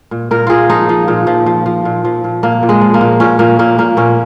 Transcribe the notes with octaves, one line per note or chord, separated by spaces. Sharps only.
A#2
A#2 A#4
A#2 F4 G#4
F3 D#4
F3
A#2
F3
F3
F3
A#2
F3
A#2
A#2 A#3
A#2
G#3
F3
A#3
A#2
A#2 C#4
A#2 A#3
A#2 A#3
A#2 A#3
A#2 C#4